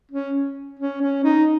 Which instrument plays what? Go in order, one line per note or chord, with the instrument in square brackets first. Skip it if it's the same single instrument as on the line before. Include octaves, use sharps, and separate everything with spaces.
[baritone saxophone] C#4
C#4
C#4
D#4